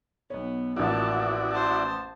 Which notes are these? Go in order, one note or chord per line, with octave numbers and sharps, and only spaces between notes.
B1 B3 C#5
A1 F3 A#3 E4 F#4 D5 A5
C5 A5